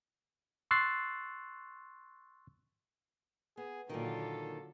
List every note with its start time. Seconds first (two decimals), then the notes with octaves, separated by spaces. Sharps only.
0.71 C6 C#6 E6 F#6 A6 C7
3.57 B3 G#4
3.89 A#2 D3 D#3 F#3 F4 A4